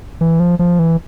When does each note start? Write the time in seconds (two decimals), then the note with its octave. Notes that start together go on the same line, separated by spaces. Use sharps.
0.21 E3
0.40 F3
0.59 F3
0.79 E3